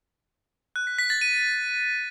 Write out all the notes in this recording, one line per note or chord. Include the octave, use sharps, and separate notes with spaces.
F#6
B6
B6
A6
D#7